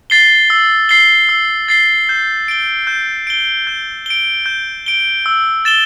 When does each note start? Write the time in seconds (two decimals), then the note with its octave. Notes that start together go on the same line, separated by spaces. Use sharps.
0.10 A6 C7 G7
0.50 E6
0.89 A6 C7 G7
1.29 E6
1.68 A6 C7 G7
2.09 G6
2.48 D7 G7
2.87 G6
3.27 D7 G7
3.67 G6
4.06 D7 G7
4.46 G6
4.86 D7 G7
5.26 E6
5.65 A6 E7 G7